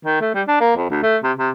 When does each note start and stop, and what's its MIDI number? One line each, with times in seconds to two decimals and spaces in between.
0.05 0.20 51
0.21 0.32 57
0.34 0.42 55
0.47 0.58 62
0.60 0.73 58
0.76 0.88 41
0.90 1.02 38
1.02 1.17 57
1.23 1.32 48
1.38 1.50 48